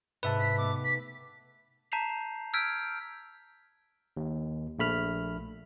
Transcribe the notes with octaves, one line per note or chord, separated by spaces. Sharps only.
G#2 C3 B4 E5 A5
D#4 B6
A3 B3 D6
B6
A5 A#5 G6 B6 C7 F7
E6 F6 G6 G#6 B6 D7
D#2
A#1 A3 B5 F6